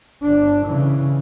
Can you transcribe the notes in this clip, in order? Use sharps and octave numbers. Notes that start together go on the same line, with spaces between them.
G1 D4
C#3 E3